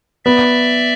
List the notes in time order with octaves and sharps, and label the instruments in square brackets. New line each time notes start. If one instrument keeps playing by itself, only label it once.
[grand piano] B3 [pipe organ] D5 E5